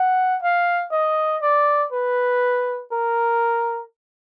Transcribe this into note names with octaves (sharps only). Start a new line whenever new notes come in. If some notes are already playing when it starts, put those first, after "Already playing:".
Already playing: F#5
F5
D#5
D5
B4
A#4